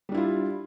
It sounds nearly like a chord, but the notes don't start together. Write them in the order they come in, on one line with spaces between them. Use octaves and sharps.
G3 D4 E4 F4